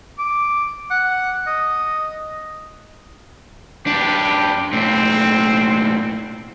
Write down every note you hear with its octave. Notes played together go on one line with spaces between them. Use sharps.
D6
F#5
D#5
F#2 D4 G4
B1 A2 C4